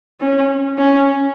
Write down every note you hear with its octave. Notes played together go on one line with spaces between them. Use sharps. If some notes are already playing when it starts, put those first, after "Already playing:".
C#4
C#4